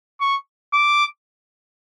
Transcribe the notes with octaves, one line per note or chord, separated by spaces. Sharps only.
C#6
D6